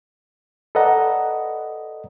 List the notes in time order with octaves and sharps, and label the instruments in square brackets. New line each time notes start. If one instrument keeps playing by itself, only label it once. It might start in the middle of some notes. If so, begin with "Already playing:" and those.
[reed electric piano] A4 B4 D5 D#5 F#5 A#5